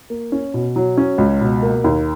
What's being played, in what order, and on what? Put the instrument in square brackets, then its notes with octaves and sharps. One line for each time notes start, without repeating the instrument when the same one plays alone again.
[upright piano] A#3
C#4
B2
F#3
C#4
C#2
B2
A#3
D#2